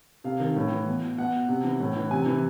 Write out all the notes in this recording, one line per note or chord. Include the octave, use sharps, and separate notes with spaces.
C3 F5
D#3
A2
E3
B2
B2 F#5
C3
E3
A2
E3
C3 G#5
E3